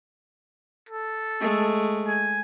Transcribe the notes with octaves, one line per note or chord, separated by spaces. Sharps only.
A4
G#3 A3
G#5